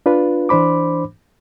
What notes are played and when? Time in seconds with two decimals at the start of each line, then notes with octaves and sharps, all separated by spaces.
0.06 D4 F4 B4
0.49 E3 D4 C5 B5 D6